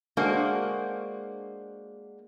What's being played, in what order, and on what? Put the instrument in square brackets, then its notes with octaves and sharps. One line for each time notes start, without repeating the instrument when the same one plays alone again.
[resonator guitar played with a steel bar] G#3 A#3 D4 F#4 C5